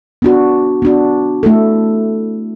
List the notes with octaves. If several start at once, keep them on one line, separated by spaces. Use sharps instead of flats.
B3 D4 F#4
B3 D4 F#4
A3 E4 A4